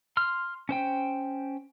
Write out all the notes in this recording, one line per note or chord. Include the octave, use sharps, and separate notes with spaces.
C6 F6
C#4 C5 G5